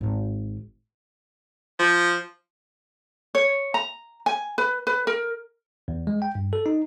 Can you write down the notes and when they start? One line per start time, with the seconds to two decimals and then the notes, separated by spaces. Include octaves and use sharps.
0.01 G#1 C4
1.79 F3
3.35 C#5
3.74 A#5
4.26 G#5
4.58 B4
4.87 B4
5.07 A#4
5.88 E2
6.07 G#3
6.22 G5
6.35 G2
6.53 A4
6.66 D#4